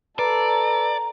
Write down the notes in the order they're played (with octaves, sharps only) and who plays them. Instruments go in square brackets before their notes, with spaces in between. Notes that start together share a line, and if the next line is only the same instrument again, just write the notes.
[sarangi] A4 [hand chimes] B4 [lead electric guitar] D5 [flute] A#5